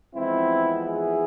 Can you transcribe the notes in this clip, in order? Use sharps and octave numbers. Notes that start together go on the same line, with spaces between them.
F2 E3 G#3 B3 C4 E4
E4 G#4